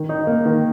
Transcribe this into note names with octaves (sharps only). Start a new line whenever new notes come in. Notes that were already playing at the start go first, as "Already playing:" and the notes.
Already playing: D#3
D#4
A#3
D#3